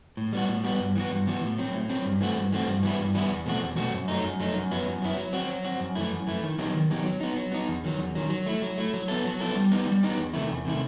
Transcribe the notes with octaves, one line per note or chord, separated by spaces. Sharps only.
A2
G3 B3 F#4
A2
G3 B3 F#4
G2
E3 B3 F#4
G2
E3 B3 F#4
A2
F#3 C4
A2
F#3 C4
G2
E3 A3 C4 F#4
G2
E3 A3 C4 F#4
G2
E3 G3 B3 E4
G2
E3 G3 B3 E4
E2
B2 A3 C4 F#4
E2
B2 A3 C4 F#4
F#2
F#3 A3 D#4
F#2
F#3 A3 D#4
F#2
F#3 B3 E4
F#2
F#3 B3 E4
F#3
C4 F#4
F#3
C4 F#4
F#2
E3 A3 E4
F#2
E3 A3 E4
D#3
F#3 B3 D#4 G4
D#3
F#3 B3 D#4 G4
F#3
B3 D#4
F#3
B3 D#4
E2
D#3 F#3
E2
D#3 F#3
F#3
A3 E4
F#3
A3 E4
F#3
B3 E4 A4
F#3
B3 E4 A4
G3
B3 D#4 G4
G3
B3 D#4 G4
E2
C3 D#3 A3 E4
E2
C3 D#3 A3 E4